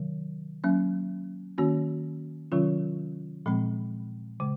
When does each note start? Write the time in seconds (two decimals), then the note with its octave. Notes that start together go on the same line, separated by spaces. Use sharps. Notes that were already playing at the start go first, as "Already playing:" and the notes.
Already playing: C3 D#3 F#3
0.64 F#3 A#3 C#4
1.58 D#3 A#3 C#4 F#4
2.52 C3 D#3 F#3 C#4 F4
3.46 A#2 F3 G#3 C4
4.40 C#3 G#3